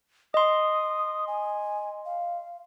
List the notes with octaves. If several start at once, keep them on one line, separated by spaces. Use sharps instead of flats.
D#5 C6 D#6
G#5
F5